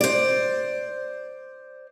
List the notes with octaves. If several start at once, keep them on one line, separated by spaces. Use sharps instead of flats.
C5 D5